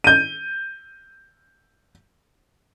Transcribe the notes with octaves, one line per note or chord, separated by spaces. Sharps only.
G6 D#7